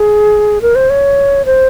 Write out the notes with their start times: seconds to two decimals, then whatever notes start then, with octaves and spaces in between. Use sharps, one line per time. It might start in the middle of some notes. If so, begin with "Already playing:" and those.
Already playing: G#4
0.62 A#4
0.75 C5
0.90 C#5
1.45 C5